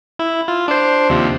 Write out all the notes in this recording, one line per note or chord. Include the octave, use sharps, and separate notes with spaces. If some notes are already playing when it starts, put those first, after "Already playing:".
E4
F4
D4 C5
D#2 C3 F3